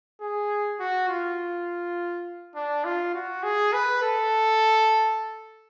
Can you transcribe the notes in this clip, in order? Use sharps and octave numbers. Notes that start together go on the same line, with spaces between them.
G#4
F#4
F4
D4
F4
F#4
G#4
B4
A4